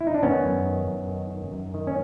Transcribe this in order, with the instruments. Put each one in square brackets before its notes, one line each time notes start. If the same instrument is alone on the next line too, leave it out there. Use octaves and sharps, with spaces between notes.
[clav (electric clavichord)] E4
D#4
D4
D#3 B3 C#4
F#2
D#3
F#2
D#3
D#3
F#2
D#3
C#4